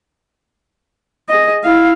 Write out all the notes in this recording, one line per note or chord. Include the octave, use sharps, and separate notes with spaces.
G#4 D#5
E4 F5